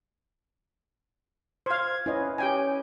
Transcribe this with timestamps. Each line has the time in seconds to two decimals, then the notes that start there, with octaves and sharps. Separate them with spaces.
1.66 C5 F5 G#6
2.06 C#4 E4 B4 D#5
2.38 C#4 G4 G5 G#5